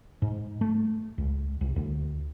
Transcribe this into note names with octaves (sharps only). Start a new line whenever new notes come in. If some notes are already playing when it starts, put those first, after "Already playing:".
G#2
A3
C#2
C2
D2